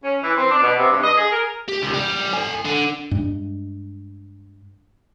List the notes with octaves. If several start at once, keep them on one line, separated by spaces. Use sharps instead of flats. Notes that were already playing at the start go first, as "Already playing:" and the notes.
C#4
E3
C4
D4
B2
C3
G2
D#5
G#4
A#4
G4
C#2
G3
A4 G#5
D3
G2 G#3